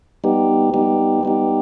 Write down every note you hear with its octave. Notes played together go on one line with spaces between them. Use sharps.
G3 B3 D#4 G4
G3 B3 D#4 G4
G3 B3 D#4 G4